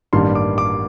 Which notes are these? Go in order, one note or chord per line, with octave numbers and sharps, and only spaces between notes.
A1 G2 D#3 G3 A#3 C6
D6
D6